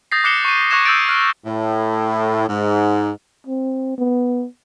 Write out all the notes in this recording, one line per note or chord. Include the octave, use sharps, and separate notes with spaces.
D#6 G6 A6 A#6 C7
D6 F#6 C7 C#7 E7 G7
C#6 D#7
C#6 D#6 F#6 G#6 A#6 E7
D#6 E6 G6 A6 D7
F6 F#6 D7
A2
G#2
C4
B3